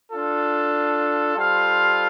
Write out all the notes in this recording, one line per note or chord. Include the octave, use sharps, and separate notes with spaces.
D4 F4 A4
G3 F4 A4 C5 F5